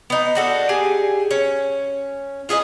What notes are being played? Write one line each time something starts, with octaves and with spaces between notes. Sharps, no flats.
B3 D#4
D4 F#4 A4
G4 G#4 G#5
C#4
F4 G#4 B4 D#5